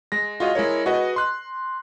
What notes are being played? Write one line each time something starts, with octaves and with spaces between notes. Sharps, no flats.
G#3 A#6
F4 F#4 G#4 D#5 F5
G#3 E4 A#4 C#5
F#4 G#4 B4 D#5
C6 F#6